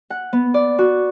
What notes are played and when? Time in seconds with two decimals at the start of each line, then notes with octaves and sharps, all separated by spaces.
0.10 F#5
0.33 B3
0.54 D5
0.79 F#4